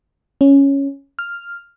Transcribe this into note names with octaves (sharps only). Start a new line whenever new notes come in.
C#4
F6